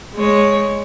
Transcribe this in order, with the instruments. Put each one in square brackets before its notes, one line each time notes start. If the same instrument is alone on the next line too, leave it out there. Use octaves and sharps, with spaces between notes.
[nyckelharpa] G#3 C#5